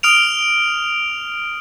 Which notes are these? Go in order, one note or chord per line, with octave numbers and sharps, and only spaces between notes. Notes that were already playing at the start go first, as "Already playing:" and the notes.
D#6 F6 D7 F7